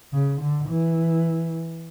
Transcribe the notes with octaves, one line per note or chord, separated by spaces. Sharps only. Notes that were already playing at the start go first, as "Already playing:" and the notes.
C#3
D3
E3